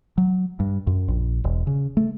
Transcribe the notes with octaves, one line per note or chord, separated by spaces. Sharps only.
F#3
G2
F#2
A#1
E1
C#3
A3